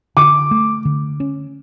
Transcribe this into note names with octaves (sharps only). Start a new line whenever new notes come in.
D3 D6
A3
D3
C#4